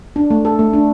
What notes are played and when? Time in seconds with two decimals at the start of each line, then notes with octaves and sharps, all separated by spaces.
0.16 D4
0.30 A3
0.45 A4
0.59 A3
0.73 D4